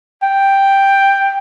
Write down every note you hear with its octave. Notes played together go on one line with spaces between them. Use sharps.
G5